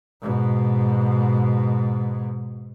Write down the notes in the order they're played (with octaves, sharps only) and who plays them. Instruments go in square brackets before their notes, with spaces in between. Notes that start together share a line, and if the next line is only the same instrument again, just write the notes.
[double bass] G#2 B2